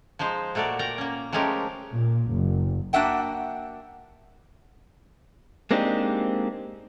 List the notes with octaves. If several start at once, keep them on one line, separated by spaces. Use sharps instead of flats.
F3 G#3 D#4 C5
A#2 A3 F#4 A#4 D5
A#4 D5 G5 A#5
A#3 C#4
F3 G#3 A3 C#4 G4 A#4
A#2
F#1
A#3 D4 F#4 E5 F#5 G5
G#3 A#3 C4 D4 D#4 G4